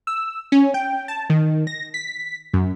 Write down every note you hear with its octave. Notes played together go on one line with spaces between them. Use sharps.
E6
C#4
G5
A5
D#3
A#6
B6
F#2